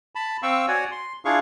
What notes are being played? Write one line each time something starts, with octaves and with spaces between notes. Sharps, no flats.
A5 B5
C4 F5 G5 C#6 E6
F#4 C#5 D5 F#5 G#5
C6
D4 E4 F4 G#4 F5 C#6